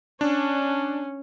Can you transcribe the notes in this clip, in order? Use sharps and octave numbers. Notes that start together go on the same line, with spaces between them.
C#4 D4